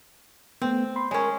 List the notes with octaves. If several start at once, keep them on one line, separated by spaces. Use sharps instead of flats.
A3 B3 C4
B5 C6
G#3 C#4 A#4 C#5